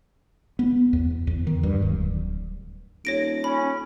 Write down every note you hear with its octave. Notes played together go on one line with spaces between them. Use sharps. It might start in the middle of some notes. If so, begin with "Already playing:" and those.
B3
E2
E2
D#3
G2
D1
D#1 C#5 A#6 D7
C#4 B5